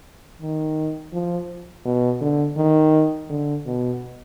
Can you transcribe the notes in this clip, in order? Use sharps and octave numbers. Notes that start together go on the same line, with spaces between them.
D#3
F3
B2
D3
D#3
D3
B2